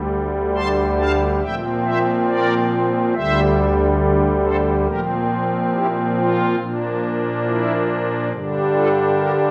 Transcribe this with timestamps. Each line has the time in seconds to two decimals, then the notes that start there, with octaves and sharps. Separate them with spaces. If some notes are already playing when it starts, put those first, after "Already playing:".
Already playing: D2 D3 G3
0.55 A5 C6
0.99 F5 A5
1.42 A#2 F3 C4 E5 G5
1.85 C5 E5
2.28 A#4 D5
3.14 D2 D3 G3 C5 E5
4.44 A4 C5
4.87 A#2 F3 C4 G4 A#4
5.73 E4 G4
6.17 F4
6.60 A#2 F3 A#3 D4
7.46 E4
8.32 G2 D3 G3 D4
8.75 F4 A4
9.18 G4 A#4